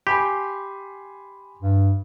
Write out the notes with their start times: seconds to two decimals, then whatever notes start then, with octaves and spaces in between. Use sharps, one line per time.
0.07 G4 G#5 B5 C6
1.62 G2